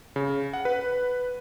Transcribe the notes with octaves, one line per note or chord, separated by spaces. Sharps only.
C#3
F#5
B4